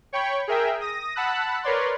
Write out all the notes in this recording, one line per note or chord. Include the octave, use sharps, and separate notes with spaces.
C#5 G5 B5 C#6
G#4 A#4 E5 G5
D#6 A#6
F#5 A5 B5 E6 F#6
A#4 B4 C#5 D5 C6